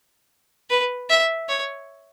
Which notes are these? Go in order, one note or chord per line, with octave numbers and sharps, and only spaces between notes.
B4
E5
C#5